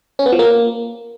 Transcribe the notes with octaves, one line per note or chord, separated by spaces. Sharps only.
C#4
B3
F3
A#3